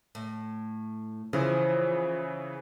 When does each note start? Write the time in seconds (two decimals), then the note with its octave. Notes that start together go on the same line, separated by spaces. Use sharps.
0.15 A2
1.33 C#3 E3 F3